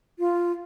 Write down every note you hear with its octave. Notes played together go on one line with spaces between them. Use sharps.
F4